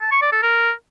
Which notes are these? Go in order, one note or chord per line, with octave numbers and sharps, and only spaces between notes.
A5
C#6
D5
A4
A#4